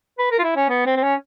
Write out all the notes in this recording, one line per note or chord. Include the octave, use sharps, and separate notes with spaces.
B4
A#4
F4
E4
C#4
B3
C4
C4
C#4